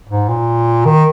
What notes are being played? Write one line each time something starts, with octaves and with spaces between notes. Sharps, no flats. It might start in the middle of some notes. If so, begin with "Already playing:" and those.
G#2
A#2
D#3